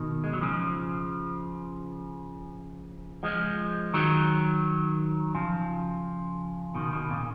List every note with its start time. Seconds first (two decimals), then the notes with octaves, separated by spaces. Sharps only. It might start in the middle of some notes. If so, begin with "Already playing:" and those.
Already playing: B2 D#3
0.24 G#3
0.33 F#3
0.41 C#3 F3
3.23 F3 G#3
3.94 D#3 F#3
5.35 C#3 F3
6.75 B2 D#3
6.93 B2 D#3
7.10 A#2 C#3